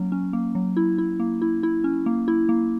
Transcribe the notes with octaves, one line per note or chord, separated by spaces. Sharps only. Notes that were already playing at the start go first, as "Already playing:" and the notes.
Already playing: F#3 A#3 C#4
C#4
A#3
F#3
E4
E4
A#3
E4
E4
C#4
A#3
E4
A#3